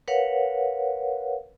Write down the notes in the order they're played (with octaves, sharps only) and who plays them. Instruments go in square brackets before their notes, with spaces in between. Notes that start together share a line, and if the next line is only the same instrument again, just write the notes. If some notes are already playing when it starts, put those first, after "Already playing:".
[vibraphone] A#4 B4 C#5 F5 F#5